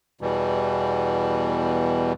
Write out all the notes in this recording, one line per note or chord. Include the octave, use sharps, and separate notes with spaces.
E2 B2 E3 G3